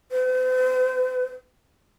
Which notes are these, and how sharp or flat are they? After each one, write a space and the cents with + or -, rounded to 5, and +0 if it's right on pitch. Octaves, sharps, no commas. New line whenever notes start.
C5 -45